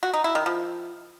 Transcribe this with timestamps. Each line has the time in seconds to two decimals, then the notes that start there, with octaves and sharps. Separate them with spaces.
0.03 F#4
0.13 D#4
0.24 E4
0.35 D#3
0.46 F3